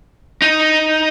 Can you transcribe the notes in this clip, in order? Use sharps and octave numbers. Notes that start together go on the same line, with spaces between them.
D#4